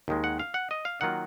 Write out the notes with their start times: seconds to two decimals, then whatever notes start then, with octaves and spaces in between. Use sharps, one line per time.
0.08 D#2 D#3 G#3
0.24 F#5
0.39 F5
0.54 F#5
0.71 D#5
0.85 F5
1.01 D#3 F#3 A#3 F4 F#5